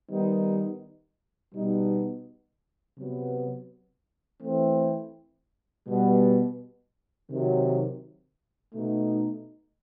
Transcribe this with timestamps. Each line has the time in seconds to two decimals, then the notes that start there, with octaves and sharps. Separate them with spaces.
0.10 D#3 G3 B3 D#4
1.55 B2 G3 B3 D#4
2.98 C3 F#3 B3
4.42 E3 A3 C4 E4
5.87 B2 G3 B3
7.31 C3 D#3 F#3
8.75 B2 A3 D#4